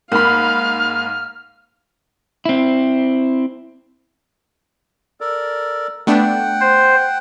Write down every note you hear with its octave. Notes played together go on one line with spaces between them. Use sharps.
G#2 A#3 F5 B5 F6
C4 E4
A4 A#4 D5
A3 B3 D4 F#5 G5
C5